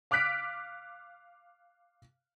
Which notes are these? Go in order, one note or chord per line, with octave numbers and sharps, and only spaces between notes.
F5 D6 F6 F#6 B6 D7